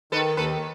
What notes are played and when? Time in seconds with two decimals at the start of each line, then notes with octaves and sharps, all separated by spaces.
0.12 D#3 A4 B4
0.37 D#2 A4 B4